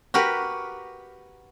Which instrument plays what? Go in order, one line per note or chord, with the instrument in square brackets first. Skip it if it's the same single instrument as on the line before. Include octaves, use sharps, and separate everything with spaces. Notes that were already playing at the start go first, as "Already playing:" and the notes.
[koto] F#4 G4 A#4 B4